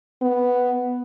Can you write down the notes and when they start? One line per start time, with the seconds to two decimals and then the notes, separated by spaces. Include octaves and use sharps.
0.22 B3